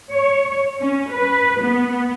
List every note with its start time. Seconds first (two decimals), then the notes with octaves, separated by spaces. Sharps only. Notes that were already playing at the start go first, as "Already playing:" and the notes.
0.10 C#5
0.78 C#4
1.10 B4
1.62 B3